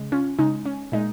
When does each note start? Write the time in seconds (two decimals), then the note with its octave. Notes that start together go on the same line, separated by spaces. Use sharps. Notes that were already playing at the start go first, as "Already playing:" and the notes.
Already playing: C#3 G#3
0.12 C#4 F4
0.39 C#3 G#3 D#4
0.66 C#4
0.92 A#2 G#3 D#4